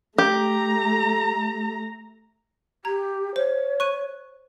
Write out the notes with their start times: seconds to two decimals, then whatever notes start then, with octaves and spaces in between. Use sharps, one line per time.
0.18 A3 G4 A#5
2.85 G4 A#5 G#6
3.36 C5 C#5
3.80 C#6 F#6 D#7